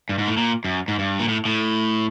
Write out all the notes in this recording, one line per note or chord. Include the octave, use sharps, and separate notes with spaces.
G2
G#2
A2
A#2
F#2
G#2
G2
A#2
A2
A2